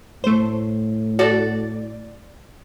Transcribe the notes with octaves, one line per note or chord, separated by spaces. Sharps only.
A2 A3 C5
F#4 A4 D5